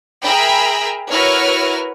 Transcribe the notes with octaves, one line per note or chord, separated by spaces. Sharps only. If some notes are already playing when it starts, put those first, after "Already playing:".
G#4 A#4 E5 G5 A#5 B5
E4 F#4 A#4 B4 C#5 F6